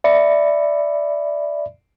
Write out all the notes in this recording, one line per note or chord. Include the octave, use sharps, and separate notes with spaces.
D5 E5 B5 C#7